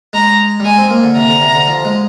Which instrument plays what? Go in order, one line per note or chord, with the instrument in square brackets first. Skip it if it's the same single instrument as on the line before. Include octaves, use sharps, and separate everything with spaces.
[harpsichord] G#3 [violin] A#5
[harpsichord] G3
[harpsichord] G#3 [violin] G#5
[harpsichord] C4
A#3
D3
[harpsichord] C3 [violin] A#5
[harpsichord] D3
C3
D3
F3
G#3